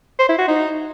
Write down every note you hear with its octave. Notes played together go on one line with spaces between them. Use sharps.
C5
E4
F#4
D#4